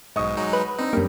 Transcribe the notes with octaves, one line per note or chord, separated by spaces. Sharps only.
B1 G#2 D#5 C#6 D#6
F#3 G#3 D#4
B4
C4 D4 D#4
F#2 D3 G3 A#3 G4